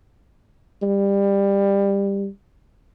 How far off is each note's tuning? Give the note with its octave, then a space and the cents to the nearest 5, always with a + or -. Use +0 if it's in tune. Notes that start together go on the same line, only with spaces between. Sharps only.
G3 +20